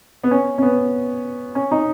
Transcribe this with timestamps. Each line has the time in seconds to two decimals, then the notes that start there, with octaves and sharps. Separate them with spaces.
0.23 B3
0.31 C#4
0.58 C#4
0.62 B3
1.55 C#4
1.71 D#4